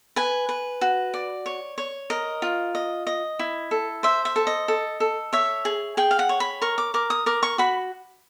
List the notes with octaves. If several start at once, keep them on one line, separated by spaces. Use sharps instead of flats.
B4 G#5
B4
F#4
D5
C#5
C#5
A#4 D#5
F4
D#5
D#5
E4
A4
C5 E5
E5
A4
D#5
A4
A4
C#5 E5
G#4
G#4 G5
F5
F#5
C#5
B5
A#4 C#6
D6
A#4 D6
D#6
A#4 D6
C#6
F#4 B5